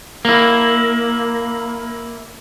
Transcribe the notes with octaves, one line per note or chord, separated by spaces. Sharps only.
A#3 E4